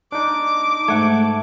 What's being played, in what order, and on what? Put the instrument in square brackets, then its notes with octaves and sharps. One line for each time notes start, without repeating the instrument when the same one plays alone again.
[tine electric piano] D4 D#4 [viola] D6
[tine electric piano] G#2 F#5 G#6 [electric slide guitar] A3